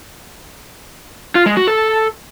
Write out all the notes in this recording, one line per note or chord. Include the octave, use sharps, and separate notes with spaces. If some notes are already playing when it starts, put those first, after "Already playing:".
F4
G#3
F#4
A4